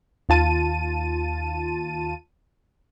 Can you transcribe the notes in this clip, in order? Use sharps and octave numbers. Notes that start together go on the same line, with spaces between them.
D#2 F4 A5 D#7